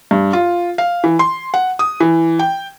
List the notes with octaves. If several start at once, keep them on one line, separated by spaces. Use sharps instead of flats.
G2
F4
F5
E3
C6
F#5
D#6
E3
G5